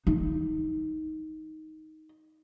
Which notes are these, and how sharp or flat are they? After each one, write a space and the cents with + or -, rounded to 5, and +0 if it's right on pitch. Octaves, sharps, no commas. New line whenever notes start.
D#4 +10